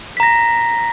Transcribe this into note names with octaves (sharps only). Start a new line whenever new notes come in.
A#5 A#6 B6